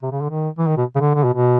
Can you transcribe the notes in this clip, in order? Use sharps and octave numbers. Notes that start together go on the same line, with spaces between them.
C3
C#3
D3
D#3
E3
D#3
B2
C#3
D3
D3
B2
B2